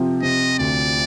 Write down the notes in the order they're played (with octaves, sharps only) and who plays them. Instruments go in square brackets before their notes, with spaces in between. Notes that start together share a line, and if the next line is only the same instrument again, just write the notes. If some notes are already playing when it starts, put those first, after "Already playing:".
Already playing: [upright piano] C3 F3
[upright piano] C3 [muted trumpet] D#5
[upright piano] D2 [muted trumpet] D5